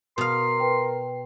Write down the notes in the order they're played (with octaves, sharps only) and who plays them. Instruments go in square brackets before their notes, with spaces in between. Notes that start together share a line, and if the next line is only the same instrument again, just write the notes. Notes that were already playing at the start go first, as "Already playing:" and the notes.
[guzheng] B2 F5 [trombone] A#4 [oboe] C6
[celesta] B4 G5